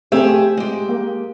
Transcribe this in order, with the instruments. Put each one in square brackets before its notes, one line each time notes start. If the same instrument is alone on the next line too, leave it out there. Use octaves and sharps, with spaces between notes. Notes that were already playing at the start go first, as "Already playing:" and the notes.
[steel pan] A3 C4 [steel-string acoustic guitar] G4 G#4 E5
[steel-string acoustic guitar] G#3 G4
[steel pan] A#3